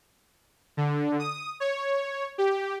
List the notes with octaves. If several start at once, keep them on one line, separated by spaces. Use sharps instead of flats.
D3
D#6
C#5
G4